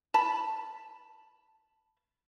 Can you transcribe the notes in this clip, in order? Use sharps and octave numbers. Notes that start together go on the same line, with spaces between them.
A5 B5